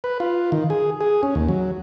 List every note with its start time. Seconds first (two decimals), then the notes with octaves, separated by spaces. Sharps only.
0.04 B4
0.20 F4
0.52 D#3
0.70 G#4
1.01 G#4
1.23 C#4
1.35 D#2
1.48 F#3